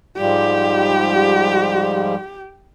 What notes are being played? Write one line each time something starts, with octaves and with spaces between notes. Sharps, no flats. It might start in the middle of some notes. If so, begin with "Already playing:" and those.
G#2 F3 G3 G4